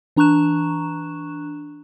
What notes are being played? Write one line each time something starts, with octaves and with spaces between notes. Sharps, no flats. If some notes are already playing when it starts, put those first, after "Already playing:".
E3 D4 A#5 C#6 F#6 E7